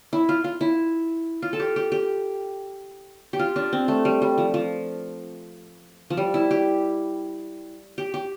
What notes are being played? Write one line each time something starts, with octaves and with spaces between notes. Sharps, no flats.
E4
F4
F4
E4
F4
A4
G4
G4
G4
G4
F4
D4
C4
A3
G3
G3
F3
F3
F3
G3
E4
G4
G4
G4